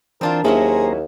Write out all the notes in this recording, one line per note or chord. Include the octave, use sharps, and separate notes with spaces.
E3 C4 D4 F4 A#4
D#2 F#3 A#3 C#4 E4 G#4 C5 A#5